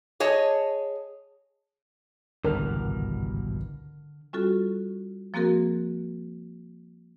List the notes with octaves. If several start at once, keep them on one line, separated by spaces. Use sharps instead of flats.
G#4 C#5 D#5 A5
G#1 C#2 G2 B2 D3 E3 A#4 F6
G3 C#4 F4 F#4 A4
F3 A#3 C4 F#4 G#4 A#4